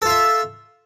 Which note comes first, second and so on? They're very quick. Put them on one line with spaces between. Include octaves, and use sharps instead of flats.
A4 F4 E5